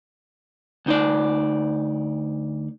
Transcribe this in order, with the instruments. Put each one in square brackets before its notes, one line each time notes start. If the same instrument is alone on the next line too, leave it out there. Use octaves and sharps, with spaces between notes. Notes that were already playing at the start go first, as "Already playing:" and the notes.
[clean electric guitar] D2 D#4 D5